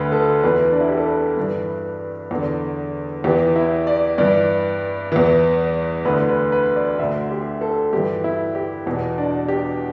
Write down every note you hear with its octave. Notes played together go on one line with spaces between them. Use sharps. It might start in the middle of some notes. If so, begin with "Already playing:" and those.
Already playing: D2 D3 B4
A4
E2 E3 B4
D4
E4
G4
A4
B4
G2 E3
E2 D3
E2 E3 G4
E4
D5
G2 E3 D5
E2 E3
D2 D3 B4
B4
B4
D5
D2 D3 E5
G4
A4
G2 E3 G4
E4
G4
E2 B2
D4
G4